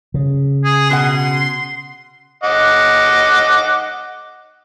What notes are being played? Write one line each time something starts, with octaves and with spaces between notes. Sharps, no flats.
C#3
G#4
B2 G#4 F#5 C6
D#5 F#5 D6